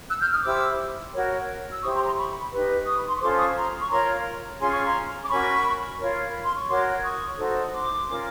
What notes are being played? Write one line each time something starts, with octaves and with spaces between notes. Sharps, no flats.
E6 F#6
F6 G6
D#6 F6
E4 G4 C5 D6 E6
F#4 A#4 C#5
E6
E4 G4 C5 C#6 D#6
A#5 C6
A#5 C6
B5 C#6
D#4 G4 B4
C#6 D#6
B5
C6
C#6
C#4 F4 A4 C5 C6 D6
C#6 D#6
A#5 C6
C#6
F4 A#4 C#5 A#5 C6
C#4 F4 G#4 C6
C#6
A#5 C6
D6
C#4 F#4 A#4 B5 C#6
F4 A#4 C#5
B5
C6
C#6
F#4 A#4 C#5 C6 D6
C#6 D#6
D#4 F#4 A4 C5
D#6
C6 D6
C#4 F4 A#4